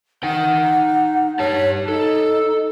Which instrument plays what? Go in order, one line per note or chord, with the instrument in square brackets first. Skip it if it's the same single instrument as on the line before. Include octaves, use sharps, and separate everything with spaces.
[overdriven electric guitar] D#4 G5 [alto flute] F#5
[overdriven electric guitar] G4 A5 [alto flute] C#5
[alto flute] D#4 [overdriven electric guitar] A4